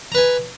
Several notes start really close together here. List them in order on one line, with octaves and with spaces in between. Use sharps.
A#5 B4 G#5